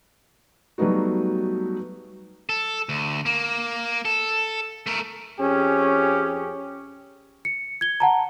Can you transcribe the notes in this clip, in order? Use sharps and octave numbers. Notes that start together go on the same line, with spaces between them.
F#3 G3 A3 B3 D#4 F#4
A4
D2
A#3
A4
A3 A#4
F2 C#4 G4 G#4
C#7
G#6 G7
F#5 A5 A#5